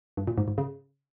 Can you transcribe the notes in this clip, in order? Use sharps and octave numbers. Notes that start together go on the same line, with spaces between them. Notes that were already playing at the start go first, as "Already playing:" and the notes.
G2
A#2
G#2
G#2
C#3